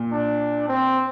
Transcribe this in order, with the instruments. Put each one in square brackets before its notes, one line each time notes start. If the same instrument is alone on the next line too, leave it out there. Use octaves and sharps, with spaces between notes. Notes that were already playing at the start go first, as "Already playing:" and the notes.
Already playing: [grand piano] A#2
[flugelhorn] D4
C4